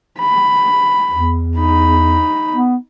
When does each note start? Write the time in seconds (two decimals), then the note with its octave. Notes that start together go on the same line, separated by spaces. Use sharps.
0.19 B5
1.11 E2
1.57 D#4 B5
2.52 B3